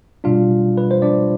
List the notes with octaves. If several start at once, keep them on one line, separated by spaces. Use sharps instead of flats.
B2 G3 D4 F4 F5
B4
C5
D4 D5